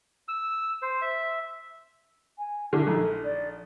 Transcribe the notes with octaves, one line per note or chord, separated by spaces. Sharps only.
E6
C5
E5
G#5
D3 E4
A#1 D#4 A4
D5